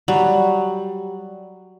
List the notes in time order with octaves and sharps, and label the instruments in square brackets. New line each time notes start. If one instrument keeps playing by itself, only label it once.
[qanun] F#3 [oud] G3